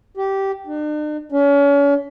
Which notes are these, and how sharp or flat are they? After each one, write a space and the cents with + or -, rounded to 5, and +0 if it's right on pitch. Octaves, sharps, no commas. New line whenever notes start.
G4 -15
D4 +45
C#4 +35